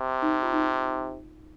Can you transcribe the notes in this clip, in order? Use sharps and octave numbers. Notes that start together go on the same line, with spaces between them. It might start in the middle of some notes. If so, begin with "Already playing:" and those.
Already playing: C3
D#4
F4
D#4